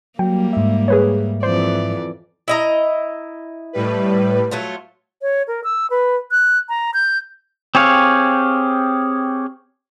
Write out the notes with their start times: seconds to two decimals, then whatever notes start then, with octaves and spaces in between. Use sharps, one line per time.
0.19 F#3 G3 A#3 G5
0.53 G#2 E5
0.88 G#4 B4 C#5
1.43 F2 E3 C5 D5
2.48 E4 D#5 A#5
3.73 A2 G3 B4
4.51 F#3 A3 F4
5.22 C#5
5.48 A#4
5.64 E6
5.90 B4
6.31 F#6
6.69 A#5
6.94 G6
7.75 C4 G4 G#4 C#5 F5